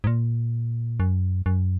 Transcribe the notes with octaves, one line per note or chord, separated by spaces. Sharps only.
G#2
A#2
F#2
F#2